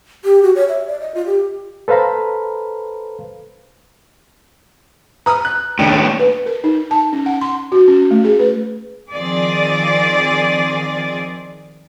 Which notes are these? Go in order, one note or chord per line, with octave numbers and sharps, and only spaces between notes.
G4
F#4
C#5
E5
D5
D#5
F4
G4
A4 B4 C5 F5 A#5 B5
B4 A#5 D#6 F6
F#6
B1 A2 D#3 D4 G5
B4
A#4
D#4
A5
C#4
F#5
C6
F#4
C#4
A3
G#4
B4
D#3 F3 C4 G#4 D5